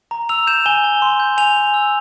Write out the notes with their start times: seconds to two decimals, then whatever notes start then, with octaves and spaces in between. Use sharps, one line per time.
0.11 A#5
0.29 E6 F7
0.47 G6 E7
0.66 G#5 G7
0.84 G#5
1.02 C6
1.20 G6
1.38 G#5 F7
1.56 G#5
1.74 E6